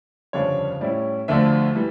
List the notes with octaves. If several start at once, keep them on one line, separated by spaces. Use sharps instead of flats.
G1 F2 C#3 G3 D4 C#5
A2 G3 C#4 E4 D5
D2 D3 F3 A3 D4 E5
E3 G3